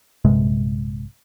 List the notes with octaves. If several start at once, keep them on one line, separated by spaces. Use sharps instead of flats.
A#1 G2 C3 G#3